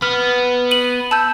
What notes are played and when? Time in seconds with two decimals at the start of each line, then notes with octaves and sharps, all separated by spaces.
0.02 B3 F6
0.71 D#7 F#7
1.11 A5 E6 G6